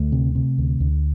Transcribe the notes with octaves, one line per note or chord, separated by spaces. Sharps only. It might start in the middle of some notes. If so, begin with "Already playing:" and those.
Already playing: D2 A3
C3
C3
D2
D2